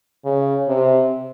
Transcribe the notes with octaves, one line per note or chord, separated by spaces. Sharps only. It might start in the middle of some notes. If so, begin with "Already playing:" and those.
C#3
C3